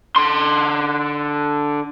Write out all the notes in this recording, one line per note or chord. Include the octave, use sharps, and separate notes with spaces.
D3 C6